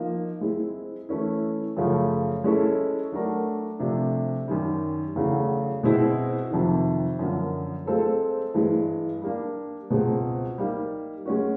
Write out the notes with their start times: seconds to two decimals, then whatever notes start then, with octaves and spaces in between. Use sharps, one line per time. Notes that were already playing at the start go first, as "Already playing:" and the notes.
Already playing: F3 A#3 D#4
0.41 G#3 C4 E4
1.09 E3 A3 C#4 E4
1.77 F#2 C#3 F3 A3
2.44 G#3 C#4 E4 A4
3.12 F#3 A3 D4 F#4 A#4
3.79 C3 F3 A3 D4
4.48 F#2 D#3 G3
5.16 E2 C#3 F#3 A3
5.83 B2 G#3 C4 E4
6.51 F2 C3 D#3
7.19 F#2 D3 F3 A#3
7.87 G#3 C4 F4 A4 C5
8.54 G2 E3 G#3
9.22 G3 A#3 D4
9.90 C#2 B2 G#3 C4
10.58 G3 A#3 D#4
11.26 G#3 C#4 F#4